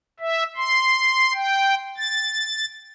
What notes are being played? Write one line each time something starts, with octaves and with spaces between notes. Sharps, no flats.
E5
C6
G5
A6